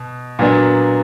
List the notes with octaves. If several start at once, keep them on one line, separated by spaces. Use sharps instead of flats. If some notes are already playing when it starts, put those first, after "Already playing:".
Already playing: B2
A#2 F#3 B3 D4